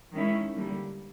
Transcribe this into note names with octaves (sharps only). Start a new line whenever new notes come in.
D#3 G#3 C#4 E4
D3 G3 A#3